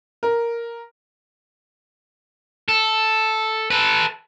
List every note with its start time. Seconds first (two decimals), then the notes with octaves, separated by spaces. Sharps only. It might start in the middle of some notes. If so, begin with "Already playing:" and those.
0.23 A#4
2.69 A4
3.71 A4 B4